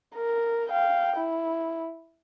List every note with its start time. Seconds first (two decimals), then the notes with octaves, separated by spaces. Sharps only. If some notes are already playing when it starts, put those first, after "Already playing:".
0.15 A#4
0.69 F5 G5
1.16 E4